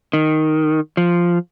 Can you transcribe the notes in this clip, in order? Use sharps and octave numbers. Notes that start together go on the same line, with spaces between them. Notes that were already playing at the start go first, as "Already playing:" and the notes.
D#3
F3